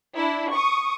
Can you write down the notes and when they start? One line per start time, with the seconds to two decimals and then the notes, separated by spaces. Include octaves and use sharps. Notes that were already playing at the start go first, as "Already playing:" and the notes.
0.16 D4 E4
0.53 C#6 D#6